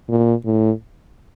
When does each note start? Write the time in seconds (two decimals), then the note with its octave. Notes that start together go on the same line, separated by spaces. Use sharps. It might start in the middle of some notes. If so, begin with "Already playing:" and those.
0.09 A#2
0.45 A2